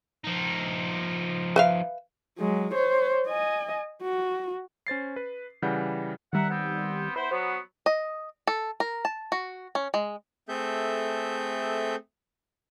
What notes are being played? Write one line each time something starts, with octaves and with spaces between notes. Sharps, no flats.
F3 D#4
B4 E5 F5
F#3 G#3
C5 C#5
D#5 G#5
F#4
C#4 C5 A6 C7
B4
C#3 E3 G3 F#5 G6
D#3 G3 A#4 E5 F#5
B3 C4
B3 E4 B4 C5
F#3 B3 C5
D#5
A4
A#4
A5
F#4
C#4
G#3
A3 C4 G#4 A4 E5 G6